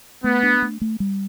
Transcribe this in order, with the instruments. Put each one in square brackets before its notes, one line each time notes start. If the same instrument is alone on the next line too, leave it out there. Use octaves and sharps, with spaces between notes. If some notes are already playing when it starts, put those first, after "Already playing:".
[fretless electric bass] A3 [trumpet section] B3
[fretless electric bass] D4
A3
A3
G3